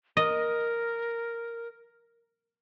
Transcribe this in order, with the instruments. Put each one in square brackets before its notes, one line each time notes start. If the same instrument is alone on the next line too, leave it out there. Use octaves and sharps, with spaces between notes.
[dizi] A#4 [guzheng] D#5